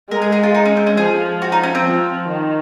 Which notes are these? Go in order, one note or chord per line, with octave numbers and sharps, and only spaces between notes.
G#3 A#4
G#4
G#4
F4
D#4
C#4
C4
C#4
F3 G#4
F#4
D#4
C#4
C4
F3
D#3